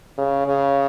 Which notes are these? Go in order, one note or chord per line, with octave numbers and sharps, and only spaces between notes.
C#3
C#3